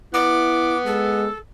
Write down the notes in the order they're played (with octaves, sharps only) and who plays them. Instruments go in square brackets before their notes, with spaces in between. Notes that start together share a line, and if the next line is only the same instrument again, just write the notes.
[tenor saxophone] B3 [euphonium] E4 [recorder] D6
[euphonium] G#3 [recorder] A4